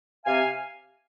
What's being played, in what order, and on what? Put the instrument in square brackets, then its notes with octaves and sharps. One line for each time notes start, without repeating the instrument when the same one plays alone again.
[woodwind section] C3 F5 G#5